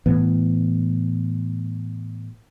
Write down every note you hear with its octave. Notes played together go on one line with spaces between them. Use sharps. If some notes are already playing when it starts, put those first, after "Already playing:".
A2 E3 B3